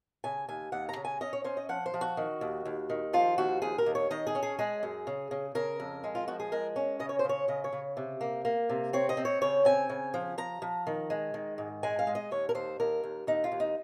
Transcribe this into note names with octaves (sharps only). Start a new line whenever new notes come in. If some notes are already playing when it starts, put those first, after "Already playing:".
C#3 G#5
D#2 G#5
D#2 F#5
A#5
C#3
G#5
C#4 D#5
C#5
C#4 C5
D#5
F3 F#5
C5
F3
F#4
D#3
D#2
D#2
D#3
F3 F4
D#2 F#4
D#2 G#4
A#4
D#2
C#5
D#3 D#5
G#4
C#4
G#4
G#3 G#4
F#2
C#3
C#3
C#3 A#4
F2
G#3
F4
F3 F#4
G#4
G#3 A#4
C#4
C#3 D#5
C#5
C5
C#3
C#5
C#3 D#5
C#5
C#3
C3
A#3
A#3
C3
C4 C#5
D#5
C4
C#5
C#3 C#5
C4 G#5
C#3
F3
F3 A#5
F3
D#3
G#3
D#3
G#2
G#3 G#5
F5
G#3
D#5
D#2 C#5
A#4
D#2 C5
D#2 A#4
D#2
D#2 D#4
F4
D#2
D#4